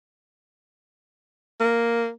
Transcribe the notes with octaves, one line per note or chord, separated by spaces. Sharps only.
A#3